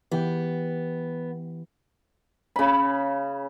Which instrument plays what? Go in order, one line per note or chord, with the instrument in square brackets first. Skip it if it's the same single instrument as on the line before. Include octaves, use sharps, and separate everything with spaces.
[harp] E3 G4 G5 [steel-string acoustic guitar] B3
[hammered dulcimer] C#3 B5